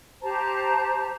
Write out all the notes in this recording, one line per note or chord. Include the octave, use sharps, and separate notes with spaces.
G4 C5 A5 A#5